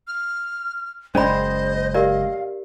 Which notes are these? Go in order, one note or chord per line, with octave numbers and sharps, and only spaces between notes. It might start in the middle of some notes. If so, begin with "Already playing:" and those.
F6
F#1 G#3 C#4 C5 D5 D#5 B5
G4 A#4 D5 F5